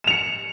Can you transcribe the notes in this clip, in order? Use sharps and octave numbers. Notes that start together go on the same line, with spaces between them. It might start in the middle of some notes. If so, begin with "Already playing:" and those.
C#7 E7 F7